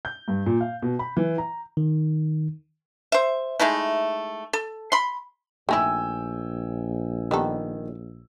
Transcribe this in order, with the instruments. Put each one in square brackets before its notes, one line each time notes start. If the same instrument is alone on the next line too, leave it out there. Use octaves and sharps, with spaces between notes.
[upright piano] G6
G2
A#2
F5
B2
B5
E3
A#5
[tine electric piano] D#3
[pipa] C5 E5
G#3 A3 D#4 E4
A4
B5 C6
[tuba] A#1 [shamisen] A3 D#4 E4 [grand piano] G5 G#5 E6
[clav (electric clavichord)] D#3 [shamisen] G3 B3 A4